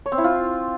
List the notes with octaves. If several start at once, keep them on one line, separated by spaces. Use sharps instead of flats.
C#5
C4
E4
F4